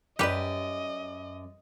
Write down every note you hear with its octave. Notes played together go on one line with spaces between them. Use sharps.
F#2 G4 B4 D5 D#5